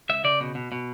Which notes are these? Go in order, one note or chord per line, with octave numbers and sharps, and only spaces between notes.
C#2 E5
C#3 D5
B2
B2
B2